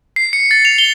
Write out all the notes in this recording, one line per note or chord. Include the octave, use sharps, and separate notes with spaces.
C7
C#7
A6
F7
G7